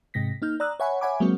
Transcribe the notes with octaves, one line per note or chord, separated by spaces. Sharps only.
G#2 C3 G#3 A#6 B6
A#3 D#4 F6 G6
D5 A#5 D#6 E6 F#6
C#5 E5 F#5 G#5 B5 C#6
C#5 E5 F#5 G#5 B5 D6
F#3 G#3 A#3 C4 F#4